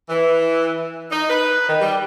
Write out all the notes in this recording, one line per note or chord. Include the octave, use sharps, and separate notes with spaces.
E3
D#4
B4
D#3
G3